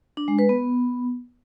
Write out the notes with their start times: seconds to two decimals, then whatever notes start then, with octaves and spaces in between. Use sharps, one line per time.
0.17 D4
0.28 G#3
0.39 B4
0.49 B3